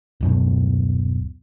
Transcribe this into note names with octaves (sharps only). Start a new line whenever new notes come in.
D1 F#2 B2